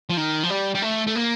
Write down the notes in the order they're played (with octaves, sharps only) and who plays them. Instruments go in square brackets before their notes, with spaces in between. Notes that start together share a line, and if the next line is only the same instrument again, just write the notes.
[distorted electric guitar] F3
D#3
F3
G3
G3
A3
A3
A#3